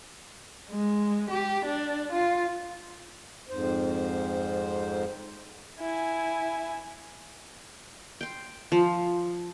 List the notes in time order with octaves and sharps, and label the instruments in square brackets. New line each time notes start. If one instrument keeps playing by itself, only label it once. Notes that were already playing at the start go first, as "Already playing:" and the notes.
[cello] G#3
G4
D4
F4
[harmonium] F2 G#2 C5
[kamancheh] E4 G#5
[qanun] G5 C6
F3